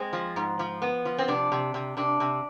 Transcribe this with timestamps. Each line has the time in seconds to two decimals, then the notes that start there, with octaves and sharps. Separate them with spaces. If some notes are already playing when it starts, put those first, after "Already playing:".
Already playing: G#3 C4
0.13 F3
0.36 G#2
0.59 F3
0.82 B3
1.05 F3
1.18 C4
1.28 C3 D4
1.52 C3
1.74 C3
1.97 C3 D4
2.20 C3